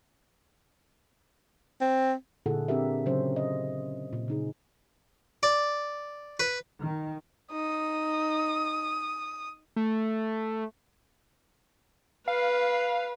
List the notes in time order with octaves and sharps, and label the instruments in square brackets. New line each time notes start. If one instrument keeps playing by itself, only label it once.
[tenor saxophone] C4
[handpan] A#2 D3 E4 G#4 A4 F#5
C4 D4 F4 G4 A#4 E5
C#3 F#3 C#4 C5
D#5
A#2
C#3 D#4 G#4
[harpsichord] D5
B4
[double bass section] D#3
[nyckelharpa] D#4 [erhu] D#6
[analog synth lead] A3
[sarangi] B4 [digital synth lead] F5